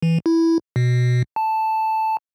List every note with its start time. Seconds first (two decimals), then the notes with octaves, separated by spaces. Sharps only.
0.03 E3
0.26 E4
0.76 B2
1.36 A5